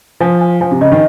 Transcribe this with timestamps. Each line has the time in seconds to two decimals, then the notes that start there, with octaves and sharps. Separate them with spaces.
0.20 F3 G#5
0.41 G#5
0.61 F3 G#5
0.71 C3
0.81 C#3 D#5
0.92 D#3